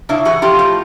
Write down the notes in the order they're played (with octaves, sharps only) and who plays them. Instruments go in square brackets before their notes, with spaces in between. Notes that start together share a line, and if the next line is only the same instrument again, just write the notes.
[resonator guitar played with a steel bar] C#3 D4 E4
E3 F#4 G#4
F3 F4 G4
A2